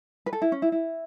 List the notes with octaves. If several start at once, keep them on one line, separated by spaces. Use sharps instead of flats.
B4
A4
E4
C#4
E4
E4